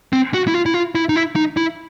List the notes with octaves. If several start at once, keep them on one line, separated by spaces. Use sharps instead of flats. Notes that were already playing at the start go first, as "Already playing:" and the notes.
C4
F#4
E4
F4
E4
F4
E4
D#4
E4
D#4
E4